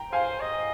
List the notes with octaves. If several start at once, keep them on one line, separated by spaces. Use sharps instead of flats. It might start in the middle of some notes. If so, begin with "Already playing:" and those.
Already playing: G5 A#5
C5 F5 G#5
D#5